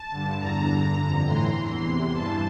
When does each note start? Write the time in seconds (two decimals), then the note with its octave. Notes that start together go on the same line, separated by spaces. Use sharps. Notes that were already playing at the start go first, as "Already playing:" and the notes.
Already playing: A5
0.11 G2 D3
0.39 E2 D3 A#5
0.68 G2 D3
0.97 F2 D3 A#5
1.25 A2 E3 C6
1.55 E2 E3
1.83 E2 C3 E3
2.11 G2 E3 A5